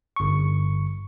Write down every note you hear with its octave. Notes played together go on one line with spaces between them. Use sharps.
G1 C#6